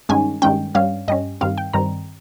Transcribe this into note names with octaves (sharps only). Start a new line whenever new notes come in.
G2 D#3 G#3 C#4 G#5
G2 D#3 G#3 C#4 G5
G2 G3 C#4 F5
G2 G3 C#4 D#5
G2 D#3 G3 C4 F5
G5
G2 D#3 G3 C4 A#5